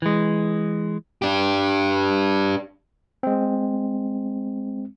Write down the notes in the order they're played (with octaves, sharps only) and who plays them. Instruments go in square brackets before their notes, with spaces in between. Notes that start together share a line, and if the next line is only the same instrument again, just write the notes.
[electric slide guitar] E3 G#3
[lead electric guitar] D4 G4
[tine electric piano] G#3 C4